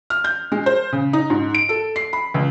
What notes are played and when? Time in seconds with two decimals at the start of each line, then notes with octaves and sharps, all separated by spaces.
0.10 F6
0.24 G6
0.52 G#3
0.66 C5
0.93 C#3
1.13 D#4
1.30 G#2
1.54 D7
1.69 A4
1.96 C7
2.13 B5
2.34 C#2